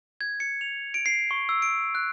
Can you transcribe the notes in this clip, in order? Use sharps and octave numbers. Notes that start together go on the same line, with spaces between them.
G#6
C#7
F7
D7
C7
C#6
E6
D7
F#6